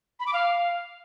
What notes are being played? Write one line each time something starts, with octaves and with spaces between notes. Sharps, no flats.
B5
D6
F5